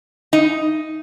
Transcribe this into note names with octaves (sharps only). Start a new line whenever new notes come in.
D#4